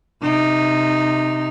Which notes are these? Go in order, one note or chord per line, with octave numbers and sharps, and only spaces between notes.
C3 D#4